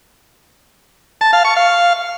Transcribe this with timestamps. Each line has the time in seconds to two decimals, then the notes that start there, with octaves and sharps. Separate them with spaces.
1.21 A5
1.33 F5
1.45 C#6
1.57 F5